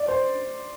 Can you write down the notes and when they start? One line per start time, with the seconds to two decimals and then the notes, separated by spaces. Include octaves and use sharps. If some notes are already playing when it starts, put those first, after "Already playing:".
Already playing: D5
0.08 C5